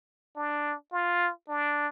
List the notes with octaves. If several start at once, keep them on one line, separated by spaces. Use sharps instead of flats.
D4
F4
D4